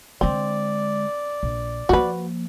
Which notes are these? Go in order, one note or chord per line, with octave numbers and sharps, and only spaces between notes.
D3 G#3 C4 D5
A#1
F3 A#3 F#4 B4